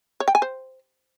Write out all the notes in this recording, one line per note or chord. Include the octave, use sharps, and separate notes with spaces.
C#5
G5
G#5
C5